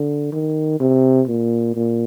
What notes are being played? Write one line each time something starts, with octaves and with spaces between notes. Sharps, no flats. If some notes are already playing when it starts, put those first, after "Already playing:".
Already playing: D3
D#3
C3
A#2
A#2